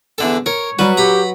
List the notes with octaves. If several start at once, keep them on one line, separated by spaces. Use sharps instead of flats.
E2 D3 A4
A#4 C#5
F#3 G3 F#4 B4
G4 A#5 B5